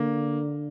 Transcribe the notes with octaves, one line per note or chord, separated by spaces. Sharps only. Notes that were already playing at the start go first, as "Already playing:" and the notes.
Already playing: D3 A#3